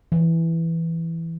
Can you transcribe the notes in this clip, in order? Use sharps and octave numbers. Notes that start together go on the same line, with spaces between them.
E3